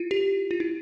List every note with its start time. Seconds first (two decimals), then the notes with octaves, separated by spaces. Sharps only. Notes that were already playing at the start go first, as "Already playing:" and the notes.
Already playing: E4 F4
0.11 G4
0.51 F4
0.60 E4